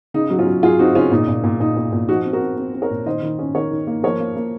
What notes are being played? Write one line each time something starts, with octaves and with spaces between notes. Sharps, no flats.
C#3 D#4
F#3
C#4 F4
F#3
F#3 F4 G#4
C4 D#4 F#4
C#3 C#4 F4
A#2 D#4
A#2
A#2
A#2 D#4
A#2
A#2
F3 D#4 F#4
C4
F#4 A#4
C4
C4
C4
A#4 C#5
A#2
D#3 C5 D#5
D#3
C#4
D#3 A#4 C#5
D#3
A#3
F3 A#4 C#5
A#3
A#3